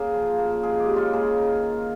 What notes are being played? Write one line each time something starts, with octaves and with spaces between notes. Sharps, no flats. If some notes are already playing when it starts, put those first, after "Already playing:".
Already playing: C#3 A#3 G#4
F3
A#3
G#3 G#4
G4
C#3
F4
A#3 G#4
D#3
D#3